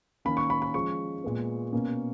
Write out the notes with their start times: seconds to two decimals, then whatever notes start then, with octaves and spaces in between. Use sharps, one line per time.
0.25 D#3 A#3 C#4 B5
0.37 C#6
0.50 B5
0.62 B5
0.74 F3 G#3 C#4 C#6
1.24 A#2 G#3 B3
1.73 B2 A#3 C#4